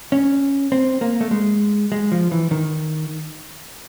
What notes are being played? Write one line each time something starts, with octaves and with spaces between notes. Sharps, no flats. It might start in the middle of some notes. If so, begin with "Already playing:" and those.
C#4
C4
A#3
A3
G#3
G#3
F3
E3
D#3